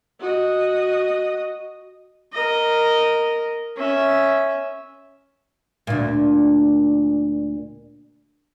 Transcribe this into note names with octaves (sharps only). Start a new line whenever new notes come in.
F#4 D#5
A#4 D#5
C#4 E5
D2 A#2